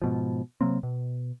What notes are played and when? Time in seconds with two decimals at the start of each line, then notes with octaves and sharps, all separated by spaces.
0.02 G#2 B2 F3
0.61 C3 F#3 A#3 C4
0.83 B2